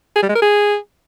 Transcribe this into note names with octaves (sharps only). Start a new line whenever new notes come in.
G#4
G3
G#3
A#4
G#4